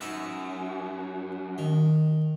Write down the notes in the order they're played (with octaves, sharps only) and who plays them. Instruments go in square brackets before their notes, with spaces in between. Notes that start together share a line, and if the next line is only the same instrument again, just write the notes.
[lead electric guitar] F#2 [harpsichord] D#4 B4 E5
[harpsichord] D#3